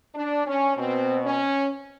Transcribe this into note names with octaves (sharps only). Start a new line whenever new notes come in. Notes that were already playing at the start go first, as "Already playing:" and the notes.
D4
C#4
B2 C4
C#4